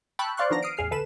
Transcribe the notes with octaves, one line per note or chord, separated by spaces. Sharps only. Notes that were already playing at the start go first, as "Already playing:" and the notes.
G5 A5 B5 C#6 E6 F#6
C5 D5 F5 C6 C#6 F#6
D#3 F3 B3 D4 A#5 A#6
D#6 F6 C7 D7
A1 E2 G#4 F6 C7
D2 A4 B4 E7